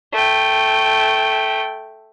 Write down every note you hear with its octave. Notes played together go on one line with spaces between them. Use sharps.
A3 G5